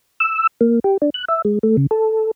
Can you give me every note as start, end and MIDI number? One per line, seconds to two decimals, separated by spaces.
0.20 0.47 88
0.61 0.79 58
0.84 0.97 67
1.02 1.10 62
1.14 1.25 90
1.29 1.42 76
1.45 1.59 56
1.63 1.76 57
1.77 1.87 49
1.91 2.31 69